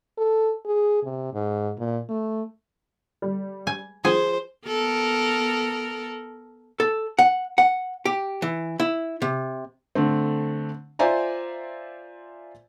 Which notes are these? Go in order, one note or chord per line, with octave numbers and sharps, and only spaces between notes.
A4
G#4
C3
G#2
A#2
A3
G3
G#5
F3 G#4 C5 G#5
B3 A4 A#4
A4
F#5
F#5
G4
E3
E4
C3
D3 A3 C4
F4 C5 D5 E5 G#5 A#5